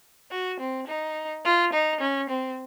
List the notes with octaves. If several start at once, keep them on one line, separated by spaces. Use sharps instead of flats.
F#4
C4
D#4
F4
D#4
C#4
C4